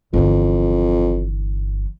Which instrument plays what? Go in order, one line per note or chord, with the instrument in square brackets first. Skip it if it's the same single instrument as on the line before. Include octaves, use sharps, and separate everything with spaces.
[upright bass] G1 E3 [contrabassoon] F2